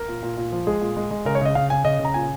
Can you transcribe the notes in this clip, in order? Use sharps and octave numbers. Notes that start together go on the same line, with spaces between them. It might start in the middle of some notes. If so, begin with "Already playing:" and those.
Already playing: A#4
A#2
A#2
A#2
F3
G#3 G#4
A#2
G#3
G#3
C#3 A#4
C#5
C#3 D#5
C#3 F5
C#3 G#5
C#3 D#5
C#3
A#5
A#2 G#5